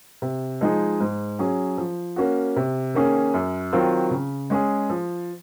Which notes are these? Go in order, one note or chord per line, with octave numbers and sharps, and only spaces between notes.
C3
F3 G#3 D#4 G#4
G#2
F#3 C#4 G#4
F3
A#3 C#4 F#4
C3
D#3 A#3 C#4 G#4
F#2
D#3 F#3 C4 F4
C#3
G#3 C#4 G#4
F3